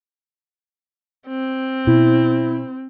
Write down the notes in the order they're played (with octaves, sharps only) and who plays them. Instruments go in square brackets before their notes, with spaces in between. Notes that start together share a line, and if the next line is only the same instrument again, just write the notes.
[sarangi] C4
[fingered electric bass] B2 [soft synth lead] E4